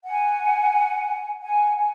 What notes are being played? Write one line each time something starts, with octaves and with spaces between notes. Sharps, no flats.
F#5 G#5
F#5 G#5
F#5 G#5